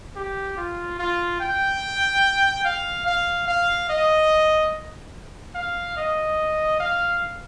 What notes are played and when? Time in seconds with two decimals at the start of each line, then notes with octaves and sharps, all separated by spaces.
0.16 G4
0.57 F4
0.99 F4
1.40 G5
2.65 F5
3.06 F5
3.48 F5
3.90 D#5
5.55 F5
5.97 D#5
6.80 F5